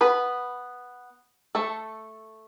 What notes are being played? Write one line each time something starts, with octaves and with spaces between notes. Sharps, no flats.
B3 B4
A3 A4